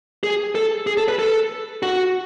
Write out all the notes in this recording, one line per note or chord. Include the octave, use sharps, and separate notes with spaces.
G#4
A4
G#4
A4
B4
A4
F#4